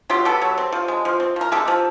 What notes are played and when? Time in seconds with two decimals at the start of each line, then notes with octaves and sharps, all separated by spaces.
0.10 F#3 F4 G4
0.25 B3 G4 A4
0.42 F#3
0.58 C4
0.72 F3
0.88 G#3
1.05 F3
1.20 C4
1.36 F3 A#4
1.52 G#3 G4 A4
1.68 F3